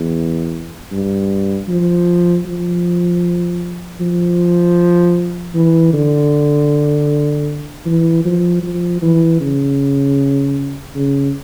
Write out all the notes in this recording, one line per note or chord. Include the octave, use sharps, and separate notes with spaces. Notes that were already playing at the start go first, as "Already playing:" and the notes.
Already playing: E2
G2
F3
F3
F3
E3
D3
E3
F3
F3
E3
C#3
C#3